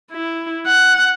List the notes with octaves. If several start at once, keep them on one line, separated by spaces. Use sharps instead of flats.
E4
F#5